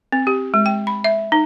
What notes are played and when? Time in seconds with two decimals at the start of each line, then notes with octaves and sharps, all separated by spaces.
0.12 C4
0.27 G4
0.54 G#3
0.66 G5
0.87 B5
1.04 E5
1.32 D#4